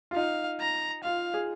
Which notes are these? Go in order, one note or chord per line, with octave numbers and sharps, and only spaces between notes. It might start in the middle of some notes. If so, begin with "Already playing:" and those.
F4
D#4 F5
A#5
F4 F5
G#4